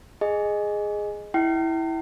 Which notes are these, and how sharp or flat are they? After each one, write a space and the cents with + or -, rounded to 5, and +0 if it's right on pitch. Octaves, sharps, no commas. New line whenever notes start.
G#4 +0 D#5 -10
E4 -10 G5 -40